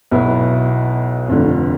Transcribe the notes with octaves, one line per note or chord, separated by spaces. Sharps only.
B1 B2 B3 E4
F1 F2 D3